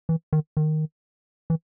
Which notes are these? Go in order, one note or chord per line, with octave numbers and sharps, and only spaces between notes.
E3
D#3
D#3
E3